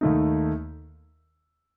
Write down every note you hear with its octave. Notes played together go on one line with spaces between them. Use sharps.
D#2 D#3 A3 D#4